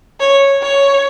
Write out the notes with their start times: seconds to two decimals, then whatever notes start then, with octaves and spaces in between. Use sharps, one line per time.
0.20 C#5
0.62 C#5